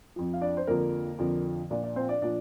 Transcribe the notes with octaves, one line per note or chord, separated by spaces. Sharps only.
F2 F3
F5
D4 D5
C5
F2 D3 F3 A#3 A#4
F2 D3 F3
A#2 F3 D4 D5
D4 D5
C4 C5
D4 D5
A#2 F3 D4 D5